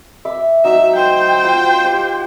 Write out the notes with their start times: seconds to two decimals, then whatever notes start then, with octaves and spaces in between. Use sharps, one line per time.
0.25 E5 D6
0.64 F#3 D#4 E5
0.96 C5 G5
1.44 F4 F5
1.84 G4